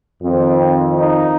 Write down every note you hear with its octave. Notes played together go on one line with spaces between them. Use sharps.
F2 D#3 C4
D#4